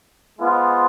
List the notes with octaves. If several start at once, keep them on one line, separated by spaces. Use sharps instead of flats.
G#3 B3 F4 C5 D#5